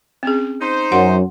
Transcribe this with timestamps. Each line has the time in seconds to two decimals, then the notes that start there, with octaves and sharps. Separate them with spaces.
0.23 C4 C#4 G#4
0.60 D#4 C5
0.92 F#2 F#5 C6